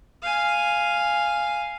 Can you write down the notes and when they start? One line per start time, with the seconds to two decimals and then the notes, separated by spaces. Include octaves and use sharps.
0.23 F5 G#5